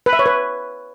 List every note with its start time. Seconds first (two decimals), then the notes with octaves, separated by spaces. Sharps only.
0.06 B4
0.13 E5
0.19 C#5
0.26 B4